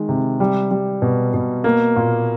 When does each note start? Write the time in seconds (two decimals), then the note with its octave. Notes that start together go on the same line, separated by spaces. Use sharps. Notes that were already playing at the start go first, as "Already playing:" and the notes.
Already playing: D#3 G#3
0.09 C3
0.40 G3
0.71 G3
1.02 B2
1.34 B2
1.64 A#3
1.96 A#2